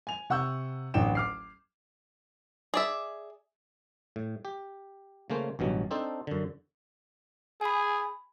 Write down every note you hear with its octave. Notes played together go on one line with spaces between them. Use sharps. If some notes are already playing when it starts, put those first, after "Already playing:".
G#5 F7
C3 F#5 C#6 E6 G6
D1 A1 D3 G5 E7
D6 F6 C7
G#4 D5 E5
A2
G4
C#3 A3 A#3 C#4 C5
A1 G2 B2 F#3
C4 D4 D#4 A4 C5
F#2 D3
G#4 G#5 B5